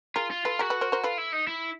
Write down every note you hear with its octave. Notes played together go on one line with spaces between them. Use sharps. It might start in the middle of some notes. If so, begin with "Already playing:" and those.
F4 G#4 A#4
F4
F4 A4 B4
F#4 G#4 A#4
A4 B4
A#4 C5
A#4 C5
F4 A4 B4
E4
D#4
E4